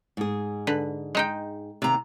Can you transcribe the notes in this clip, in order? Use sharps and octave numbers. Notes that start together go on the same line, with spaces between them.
G#2 G#4
D3 B4
G#3 D#4 G5
D#2 C3 A#3 A#5